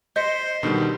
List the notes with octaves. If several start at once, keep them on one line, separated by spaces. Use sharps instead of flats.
C5 D#5 G6 B6 C#7
B2 D3 D#3 G3 D#4